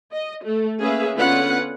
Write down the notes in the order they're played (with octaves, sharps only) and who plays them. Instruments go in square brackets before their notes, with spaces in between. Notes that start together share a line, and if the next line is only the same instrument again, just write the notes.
[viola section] D#5
A3
A#3 C#4 G#4 B4 E5 F5
D3 B3 C#4 F4 B4 F#5